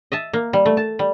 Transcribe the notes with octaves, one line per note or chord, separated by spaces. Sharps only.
D#5 E5 A5
A#3
G3
A3
A5
G3